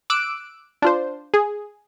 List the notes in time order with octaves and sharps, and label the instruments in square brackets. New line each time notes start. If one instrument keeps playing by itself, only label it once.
[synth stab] D6 E6 F#6 D7
D4 F4 C5
G#4